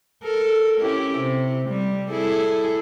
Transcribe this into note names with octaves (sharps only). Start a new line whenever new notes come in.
A4 A#4
C#4 E4 G4
C3
G3
E4 G#4 A4